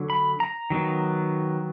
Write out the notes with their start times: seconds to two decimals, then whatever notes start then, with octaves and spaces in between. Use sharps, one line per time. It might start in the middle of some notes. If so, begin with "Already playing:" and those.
Already playing: D3 F#3
0.10 B5
0.40 A#5
0.70 D#3 F#3 B3